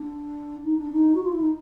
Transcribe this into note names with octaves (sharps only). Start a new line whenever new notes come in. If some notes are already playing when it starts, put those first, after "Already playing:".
Already playing: D4
D#4
D4
D#4
F#4
F4
E4
D#4